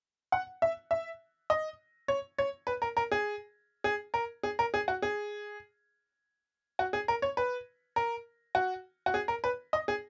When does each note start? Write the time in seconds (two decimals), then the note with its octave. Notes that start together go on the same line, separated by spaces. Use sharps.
0.32 F#5
0.62 E5
0.91 E5
1.50 D#5
2.08 C#5
2.38 C#5
2.67 B4
2.82 A#4
2.97 A#4
3.12 G#4
3.84 G#4
4.14 A#4
4.43 G#4
4.59 A#4
4.74 G#4
4.88 F#4
5.03 G#4
6.79 F#4
6.93 G#4
7.08 A#4
7.22 C#5
7.37 B4
7.96 A#4
8.55 F#4
9.06 F#4
9.14 G#4
9.28 A#4
9.44 B4
9.73 D#5
9.88 G#4